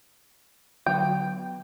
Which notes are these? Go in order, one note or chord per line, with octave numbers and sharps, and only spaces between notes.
D3 F#3 B3 G5